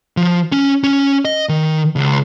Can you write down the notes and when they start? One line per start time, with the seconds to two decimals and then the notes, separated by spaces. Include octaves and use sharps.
0.17 F3
0.52 C#4
0.83 C#4
1.25 D#5
1.49 D#3
1.96 C#2